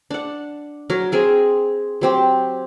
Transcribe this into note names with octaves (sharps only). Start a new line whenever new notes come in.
D4 F#5
F#3 A#4
C4 G#4 A#4
F#3 C4 G4